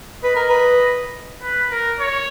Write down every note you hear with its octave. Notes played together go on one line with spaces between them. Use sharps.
B4 D#5
A#4
B4
B4
A#4
C#5